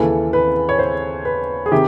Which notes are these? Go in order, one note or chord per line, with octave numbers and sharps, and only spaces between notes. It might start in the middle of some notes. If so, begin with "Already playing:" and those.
Already playing: D#2 C#3 E3 A4
B4
C#5
C5
B4
G#4
C3 D#3 G4